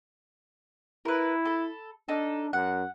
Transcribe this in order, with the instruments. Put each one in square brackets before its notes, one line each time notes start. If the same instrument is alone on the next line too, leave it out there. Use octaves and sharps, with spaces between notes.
[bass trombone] E4 [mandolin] A#4 B4
[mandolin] A4 B5
[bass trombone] D4 [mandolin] D#4 A4
[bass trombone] F#2 [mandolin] F#5